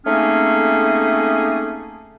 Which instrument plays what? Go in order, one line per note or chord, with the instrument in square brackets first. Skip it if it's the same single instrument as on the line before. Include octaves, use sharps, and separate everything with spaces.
[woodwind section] A3 A#3 C4 C#4 D#4 G#4